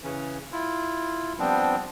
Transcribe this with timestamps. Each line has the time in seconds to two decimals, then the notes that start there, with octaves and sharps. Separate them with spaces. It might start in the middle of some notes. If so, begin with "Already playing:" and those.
0.04 C#3 E3 C#4
0.52 E4 F4
1.39 F3 G3 B3 C4 D4